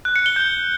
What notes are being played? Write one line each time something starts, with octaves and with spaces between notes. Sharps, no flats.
F#6
C#7
G7
G6